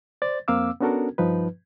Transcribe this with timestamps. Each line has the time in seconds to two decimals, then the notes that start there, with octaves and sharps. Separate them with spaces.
0.22 C5 D5 A6
0.48 F2 A#3 C4 F5 D6 E6
0.80 B3 C#4 D4 F#4 A4 A#4
1.18 G2 F3 D#4 B4